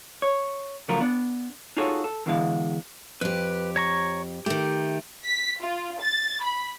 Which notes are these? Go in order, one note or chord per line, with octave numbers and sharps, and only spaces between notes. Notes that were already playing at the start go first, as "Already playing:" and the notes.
C#5
C#3 F3 F#3 A3 F4 A#4
B3 D4
D#4 F4 F#4 G#4 A4 C#5
A4
E2 B2 D3 E3 G#3 F5
F2 G4 B4
C#5 A#5 C#6
D#3 A3 G4
B6
F4
A6
B5